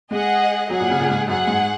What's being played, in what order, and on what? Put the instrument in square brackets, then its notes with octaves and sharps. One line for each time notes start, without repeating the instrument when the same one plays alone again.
[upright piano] G#3 [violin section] G#4 D#5 F#5
[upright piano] F#3 [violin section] G#4 F#5
[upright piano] A#2
C#3
A#2
G#2
[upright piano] F#2 [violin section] G#4 F#5
[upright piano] G#2